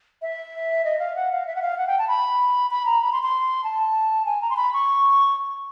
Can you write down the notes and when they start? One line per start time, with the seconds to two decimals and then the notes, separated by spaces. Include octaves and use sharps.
0.22 E5
0.85 D#5
0.99 F5
1.16 F#5
1.31 F5
1.47 E5
1.55 F#5
1.62 F5
1.78 F#5
1.87 G5
1.99 A5
2.08 B5
2.70 B5
2.86 A#5
3.01 B5
3.12 C6
3.23 C6
3.64 A5
4.25 G#5
4.42 A#5
4.50 C6
4.56 B5
4.73 C#6